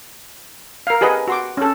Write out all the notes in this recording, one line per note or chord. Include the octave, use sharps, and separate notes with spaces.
A#4 F5
G4 G#4 B4 D#5 F#5
F#4 C6 D6
C#4 A4